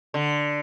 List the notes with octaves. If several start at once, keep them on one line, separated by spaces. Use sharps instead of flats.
D3